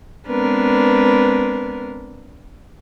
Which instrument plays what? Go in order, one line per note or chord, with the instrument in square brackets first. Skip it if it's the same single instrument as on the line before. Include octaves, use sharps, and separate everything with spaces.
[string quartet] G#3 B3 C4 D4 A#4 B4